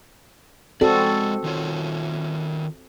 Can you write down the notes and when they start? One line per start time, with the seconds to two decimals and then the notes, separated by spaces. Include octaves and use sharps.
0.81 G#3 C4 F#4 A4 D5
1.44 D#3 F4 C#5